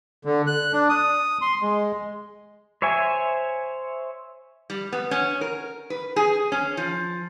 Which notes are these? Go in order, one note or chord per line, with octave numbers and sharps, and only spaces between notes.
D3
F#6
D4
D#6
C6
G#3
C5 C#5 E5 G#5
G3
B3
C#4
A#4
B4
G#4
C#4
F3